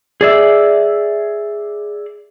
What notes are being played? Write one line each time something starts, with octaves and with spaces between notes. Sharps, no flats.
G#4 D5 E5